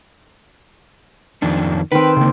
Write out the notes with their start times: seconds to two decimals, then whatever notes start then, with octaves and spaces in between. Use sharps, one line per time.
1.42 F2 D#3 D4
1.92 D#3 C4 B4
2.17 C#3 A#3